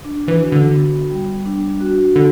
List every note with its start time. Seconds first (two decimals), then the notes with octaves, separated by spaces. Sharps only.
0.04 D4
0.28 E3
0.40 F#4
0.52 D3
0.75 B3
1.11 G3
1.46 D4
1.80 F#4
2.15 D3 B3